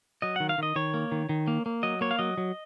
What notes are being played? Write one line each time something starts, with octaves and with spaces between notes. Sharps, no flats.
F#3 D#5
D#3 F#5
F5
D#3 D#5
D#3 C#5
A#3
D#3
D#3
A#3
A#3
F#3 D#5
A#3 C#5
F5
F#3 D#5
F#3